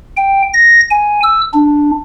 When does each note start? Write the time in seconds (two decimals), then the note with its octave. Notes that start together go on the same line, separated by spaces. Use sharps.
0.17 G5
0.54 A#6
0.91 G#5
1.23 E6
1.53 D4